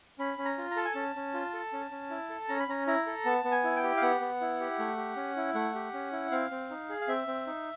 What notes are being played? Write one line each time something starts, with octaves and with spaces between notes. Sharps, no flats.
C#4 B5
C#4
A#5
F4
A#5
A4 A5
G#5
C#4 A5
C#4
F4
A4
C#4
C#4
E4
A4
C#4 A#5
B5
C#4 A#5
E4 A#5
A4
B3 A5
B3
G#5
E4
G5
G4
F5
B3 F#5
B3
E4
G4
A3
G4
C#4
E4
A3 F#5
G4
C#4
E4
C4 F5
C4
D#4
G#4
F5
C4 E5
C4
D#4